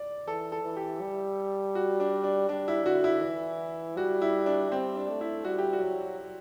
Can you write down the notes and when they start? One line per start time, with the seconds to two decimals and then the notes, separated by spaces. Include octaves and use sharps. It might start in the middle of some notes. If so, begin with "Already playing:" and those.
Already playing: D5
0.27 E3 A4
0.52 A4
0.63 E3
0.76 G4
1.01 G3
1.75 F#4
2.00 D4
2.24 D4
2.49 G3 D4
2.68 E4
2.85 D3 F#4
3.04 E4
3.23 E3
3.96 G3 F#4
4.22 E4
4.46 D4
4.71 G3 C4
4.96 D4
5.08 A3
5.21 E4
5.44 G3 F#4
5.58 G4
5.73 F#4
5.82 F#3